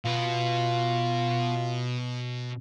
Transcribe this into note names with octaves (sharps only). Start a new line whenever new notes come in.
B2 F4 B4